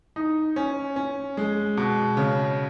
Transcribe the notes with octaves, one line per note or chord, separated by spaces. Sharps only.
D#4
C#4
C#4
G#3
B2
C#3